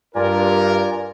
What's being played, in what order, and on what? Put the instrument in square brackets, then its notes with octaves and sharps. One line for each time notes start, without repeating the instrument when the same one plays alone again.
[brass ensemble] G2 A#4 [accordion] F4 D5 G#5